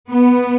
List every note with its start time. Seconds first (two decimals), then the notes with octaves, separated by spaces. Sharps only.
0.11 B3